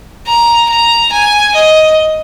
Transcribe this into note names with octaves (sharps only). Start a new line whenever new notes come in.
A#5
A#5
G#5
D#5